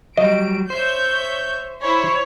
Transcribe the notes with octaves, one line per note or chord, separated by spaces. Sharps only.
F#3 G3 D#5 D7
C5 C#5 E5 G6
E4 C5 C#5 B5